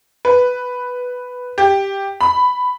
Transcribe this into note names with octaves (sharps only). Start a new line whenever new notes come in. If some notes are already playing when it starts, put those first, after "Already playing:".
B4
G4
B5